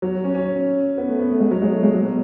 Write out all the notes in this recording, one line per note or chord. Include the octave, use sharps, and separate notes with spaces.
F#3
C#4
C#4
B3
A3
B3
A3
G#3
F#3
G#3
A3
G#3
F#3
B2